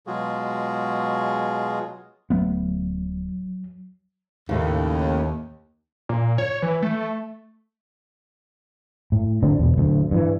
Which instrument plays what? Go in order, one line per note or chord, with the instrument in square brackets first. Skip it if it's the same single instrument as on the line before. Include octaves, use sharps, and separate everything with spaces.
[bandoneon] B2 F#3 G#3 F4 F#4 G#4
[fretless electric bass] D1 A3 B3 [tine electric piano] F#3
[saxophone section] D#2 [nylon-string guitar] A2 C#3
[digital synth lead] A#2
C#5
E3
A3
[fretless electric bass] A2
D2 D3 C4 D4
E2 B2
D1 D2
G2 E3